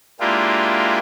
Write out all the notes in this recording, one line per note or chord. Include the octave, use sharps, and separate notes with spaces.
G#3 A#3 D4 E4 F4 G4